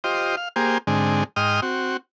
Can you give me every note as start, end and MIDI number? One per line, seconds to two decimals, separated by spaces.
0.04 0.36 65
0.04 0.36 67
0.04 0.36 72
0.04 0.36 75
0.37 0.49 77
0.56 0.78 58
0.56 0.78 67
0.56 0.78 68
0.56 0.78 72
0.87 1.24 44
0.87 1.24 50
0.87 1.24 56
0.87 1.24 60
1.36 1.60 44
1.36 1.60 75
1.36 1.60 79
1.36 1.60 84
1.36 1.60 87
1.36 1.60 89
1.62 1.97 60
1.62 1.97 66